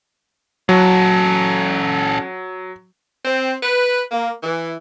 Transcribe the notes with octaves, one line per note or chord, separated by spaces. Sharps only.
F#3 C#4 A4
C4
B4
A#3
E3